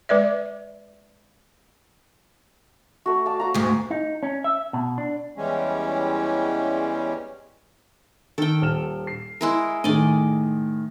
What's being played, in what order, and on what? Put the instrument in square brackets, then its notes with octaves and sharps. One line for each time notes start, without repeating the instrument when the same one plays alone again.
[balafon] G#3 B4 D5 E5
[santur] A3 F#4
D5 F5 A5
F#4 C5 A#5
[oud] D2 G#2
[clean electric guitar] D#4
C#4
E5
B2
D4
[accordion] E2 E3 G3 G#3 C#4
[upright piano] D#3 [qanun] A4 G5
[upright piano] D#1 F6 E7
C7
[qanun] G#3 E4 A#4
[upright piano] A2 D#3 G#4 [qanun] D5 D#5